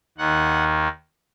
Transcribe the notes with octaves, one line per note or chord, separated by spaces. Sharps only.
D#2 D#3 F#5